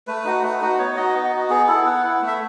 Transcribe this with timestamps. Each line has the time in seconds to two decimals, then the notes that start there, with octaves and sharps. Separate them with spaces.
0.07 A3 B4
0.25 D#4 F#4
0.43 A3
0.61 D#4 F#4
0.78 B3 C#5
0.96 D#4 F#4 D#5
1.14 B3
1.32 D#4 F#4
1.50 B3 G#4
1.68 E4 A4
1.85 B3 F#5
2.04 E4
2.22 A3
2.27 E5